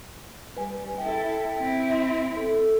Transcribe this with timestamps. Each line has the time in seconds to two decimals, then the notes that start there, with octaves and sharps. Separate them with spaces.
0.56 G3 B4 G#5
0.98 E4 A4 G5
1.59 C4 E4
2.37 A4